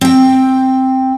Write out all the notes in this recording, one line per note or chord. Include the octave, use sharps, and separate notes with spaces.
C4 G5